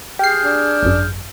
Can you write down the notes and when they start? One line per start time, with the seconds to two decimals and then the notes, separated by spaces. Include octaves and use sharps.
0.19 G4 G#4 F6 G6 C7
0.44 D4
0.83 G#1 F#2